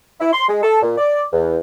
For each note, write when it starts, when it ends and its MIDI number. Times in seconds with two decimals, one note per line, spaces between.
0.20 0.31 64
0.33 0.48 84
0.49 0.61 56
0.63 0.80 69
0.82 0.96 46
0.98 1.24 74
1.33 1.57 40